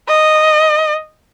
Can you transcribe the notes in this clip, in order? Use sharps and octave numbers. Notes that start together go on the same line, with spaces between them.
D#5